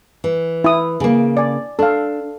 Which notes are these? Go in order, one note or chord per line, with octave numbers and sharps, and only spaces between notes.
E3
E4 D#6
C#3 A#3
D5 G#5
D4 A4 F5